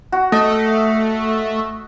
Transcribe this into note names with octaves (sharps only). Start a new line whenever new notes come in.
F#4
A3 D#5